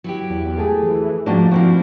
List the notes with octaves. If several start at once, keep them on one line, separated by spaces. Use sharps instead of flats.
F#3 E4 G4
E2
A3 G#4
E3
F2 G#2 F3 A3 A#3 D4 F#4
A#2 F3 A#3 C4 E4 F#4